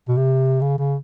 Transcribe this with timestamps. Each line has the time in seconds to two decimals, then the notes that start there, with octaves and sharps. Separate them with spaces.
0.08 B2
0.17 C3
0.61 C#3
0.78 C#3